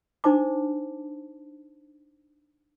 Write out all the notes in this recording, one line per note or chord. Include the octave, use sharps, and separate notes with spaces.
D4 D#4 C5 A5 D6